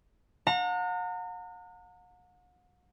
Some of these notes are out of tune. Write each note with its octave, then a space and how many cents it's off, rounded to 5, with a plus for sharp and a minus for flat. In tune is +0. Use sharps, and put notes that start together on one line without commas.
F#5 -40 A#5 -35